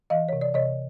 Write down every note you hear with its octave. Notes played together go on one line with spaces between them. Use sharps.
E3 D#5 F5
C3 C#5
D5
C3 C#5 D#5